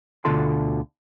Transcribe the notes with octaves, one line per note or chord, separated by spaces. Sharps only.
D2 B2 D3 F4 A4 C6